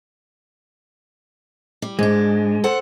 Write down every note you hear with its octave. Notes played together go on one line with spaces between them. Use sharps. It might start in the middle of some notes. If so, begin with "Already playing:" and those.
G3
G#2 G#3 D4
A4 C5 F#5